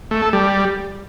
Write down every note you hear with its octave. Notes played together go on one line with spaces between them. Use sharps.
A3
A4
G3